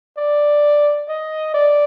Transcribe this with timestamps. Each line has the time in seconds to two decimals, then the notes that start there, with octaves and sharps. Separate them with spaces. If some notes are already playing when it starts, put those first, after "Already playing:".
0.17 D5
1.08 D#5
1.54 D5